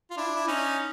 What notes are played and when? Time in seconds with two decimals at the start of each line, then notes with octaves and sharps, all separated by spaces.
0.11 F4
0.17 D4 E4
0.36 E4
0.48 C#4 D#4